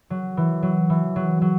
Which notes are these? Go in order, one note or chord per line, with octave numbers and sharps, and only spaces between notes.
F#3
E3
F#3
E3
F#3
F#3